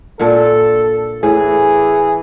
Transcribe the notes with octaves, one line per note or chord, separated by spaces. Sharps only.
A#2 D4 A4 F#5
A2 E3 G#4